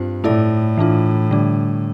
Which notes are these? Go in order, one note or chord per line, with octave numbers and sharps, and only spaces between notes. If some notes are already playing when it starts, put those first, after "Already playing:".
Already playing: G2 C4 F4 C5
A2 A3 E4 A4 D5
E3 A3 D4 F4
D3 G3 D4